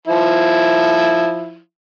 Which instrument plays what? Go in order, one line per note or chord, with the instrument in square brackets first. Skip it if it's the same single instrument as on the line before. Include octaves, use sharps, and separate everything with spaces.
[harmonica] F3 E4